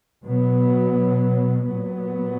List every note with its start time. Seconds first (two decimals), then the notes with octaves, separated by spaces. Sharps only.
0.24 B2 F#3 B3
1.67 A#2 F#3 B3